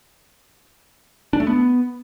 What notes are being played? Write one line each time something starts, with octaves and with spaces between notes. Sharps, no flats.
D4
A3
B3